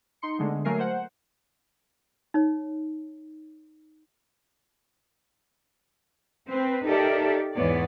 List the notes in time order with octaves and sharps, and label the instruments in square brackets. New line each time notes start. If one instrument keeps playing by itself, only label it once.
[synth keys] D#4 C6 C#7
D3 G#3 A3 B3
F#3 A3 A#3 A#4 G#5 C7
C5 F#5
[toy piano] D#4 C#5
[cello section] C4 B4
D#4 G4 A4 A#4 D5 E5
E2 G#2 E3 B3 C#5 D5